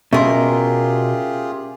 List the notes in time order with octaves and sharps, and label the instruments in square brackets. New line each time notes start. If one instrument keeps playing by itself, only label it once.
[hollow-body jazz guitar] B2 [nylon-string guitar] C#4 A#4 [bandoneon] F4 G4 G#4 [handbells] E5 C6